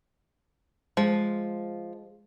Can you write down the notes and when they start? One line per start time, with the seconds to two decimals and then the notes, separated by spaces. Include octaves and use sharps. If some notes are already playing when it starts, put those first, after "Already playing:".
0.97 F3 G#3